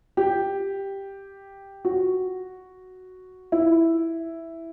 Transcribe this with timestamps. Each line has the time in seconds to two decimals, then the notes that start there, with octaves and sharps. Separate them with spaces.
0.17 G4
1.85 F#4
3.52 E4